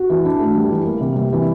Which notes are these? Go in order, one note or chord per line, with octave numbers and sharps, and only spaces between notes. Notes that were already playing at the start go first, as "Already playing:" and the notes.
Already playing: F#4
E3
D4
A3
G3
E3
A#3
C3
G3
E3